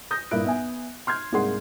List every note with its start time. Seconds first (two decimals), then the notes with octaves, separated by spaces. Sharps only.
0.11 D#6 G6 A#6
0.31 G2 A#2 A#3 E4 F#6 D7
0.45 B3 E5 G#5
1.07 C6 F6 G6 G#6
1.32 C2 G#2 A#3 G#4 F#5 C6